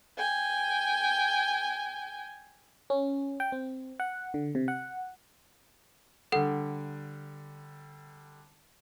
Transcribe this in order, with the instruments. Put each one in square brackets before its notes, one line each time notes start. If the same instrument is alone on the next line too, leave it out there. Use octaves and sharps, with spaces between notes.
[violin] G5 G#5
[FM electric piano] C#4
G5
C4
F#5
D3
C3
F#5
[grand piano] D3 G3 [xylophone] A4 F#5